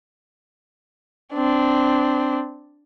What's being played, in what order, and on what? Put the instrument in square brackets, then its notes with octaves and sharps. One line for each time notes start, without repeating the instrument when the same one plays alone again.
[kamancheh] C4 D4